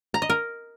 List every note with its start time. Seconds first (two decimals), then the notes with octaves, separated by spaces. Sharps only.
0.14 A#5
0.22 D#5
0.30 A#4